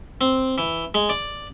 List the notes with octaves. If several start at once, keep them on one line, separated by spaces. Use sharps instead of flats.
C4
E3
G#3
D5